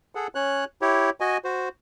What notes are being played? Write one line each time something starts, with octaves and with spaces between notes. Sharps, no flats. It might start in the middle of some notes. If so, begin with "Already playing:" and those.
G#4 A4 F#5
C#4 C#5 F#6
E4 G4 C#5
F#4 D#5 G#5
F#4 C5